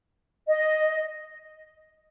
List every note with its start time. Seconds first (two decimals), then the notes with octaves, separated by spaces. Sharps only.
0.47 D#5